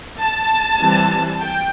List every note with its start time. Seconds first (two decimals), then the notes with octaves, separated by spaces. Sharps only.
0.19 A5
0.80 E3 G3 C4
1.42 G5